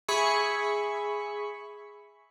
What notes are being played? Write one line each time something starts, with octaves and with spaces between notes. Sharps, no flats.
G#4 E5 B5 C#6